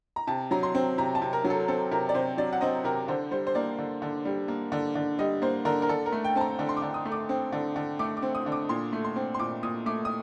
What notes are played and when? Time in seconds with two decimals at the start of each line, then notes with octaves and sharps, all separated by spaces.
0.16 A#5
0.27 C3 A5
0.51 F#3 A#5
0.63 C6
0.75 C4
0.98 C3 A#5
1.15 A5
1.22 C3
1.33 A#4
1.44 F#3
1.50 A4
1.68 C4 A4
1.91 C3 A#4
2.09 D5
2.14 C3 C5
2.38 F#3 D5
2.53 F#5
2.61 C4 D#5
2.84 C3 A#4
3.08 D3 C5
3.31 G3 C5
3.47 C5
3.55 A#3 D5
3.78 D3
4.02 D3
4.25 G3
4.48 A#3
4.72 D3
4.95 D3
5.19 G3 D#5
5.42 A#3 C5
5.65 D3 A#4
5.82 A#4
5.89 D3 A4
6.06 A#4
6.12 A3
6.24 G5
6.36 C4 A5
6.41 A#5
6.59 D3
6.69 C6
6.77 D6
6.82 D3
6.94 D#6
7.05 A3
7.12 D6
7.29 C4
7.52 D3
7.76 D3
7.99 A3 D6
8.17 D6
8.22 C4
8.35 D#6
8.46 D3
8.52 D6
8.69 A#2 C6
8.93 A3
9.04 C6
9.16 C4
9.34 C6
9.39 A#2 D6
9.63 A#2 D#6
9.86 A3 D6
10.05 D#6